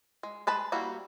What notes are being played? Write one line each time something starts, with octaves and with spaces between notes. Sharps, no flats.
G#3
G#3 B4 A5 B5
G3 A#3 E4 F#4